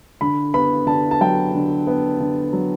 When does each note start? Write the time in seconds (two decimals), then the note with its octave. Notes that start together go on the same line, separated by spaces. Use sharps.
0.21 D3 B5
0.54 B3 B5
0.87 D3 A5
1.11 A5
1.21 F#3 G5
1.54 D3
1.87 B3
2.20 D3
2.53 F#3